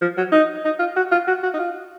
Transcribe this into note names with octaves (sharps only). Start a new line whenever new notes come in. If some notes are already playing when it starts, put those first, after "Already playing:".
F3
F#3
D#4
D#4
F4
F#4
F4
F#4
F#4
D#4
F4